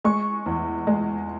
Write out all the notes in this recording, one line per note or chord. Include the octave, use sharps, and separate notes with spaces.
G#3 C#6
E2
G#3